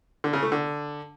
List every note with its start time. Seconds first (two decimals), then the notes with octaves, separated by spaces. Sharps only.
0.24 D3
0.33 C#3
0.43 A3
0.52 D3